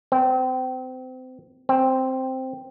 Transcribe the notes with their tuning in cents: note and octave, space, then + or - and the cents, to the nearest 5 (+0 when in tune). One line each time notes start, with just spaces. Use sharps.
C4 -30
C4 +0